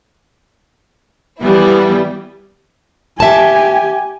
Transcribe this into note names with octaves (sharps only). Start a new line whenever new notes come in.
E3 G3 B3 E4
G4 E5 G#5 A5